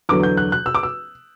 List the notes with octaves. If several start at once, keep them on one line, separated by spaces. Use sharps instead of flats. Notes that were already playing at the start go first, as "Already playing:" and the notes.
E2 D3 F#3 D6
G6
F#6
F#6
E6
D6
E6